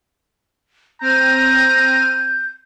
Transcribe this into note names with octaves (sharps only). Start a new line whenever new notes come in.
C4 A#5 F6 G6 D#7